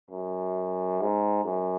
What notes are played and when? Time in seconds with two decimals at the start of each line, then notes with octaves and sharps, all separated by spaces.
0.10 F#2
1.01 G#2
1.44 F#2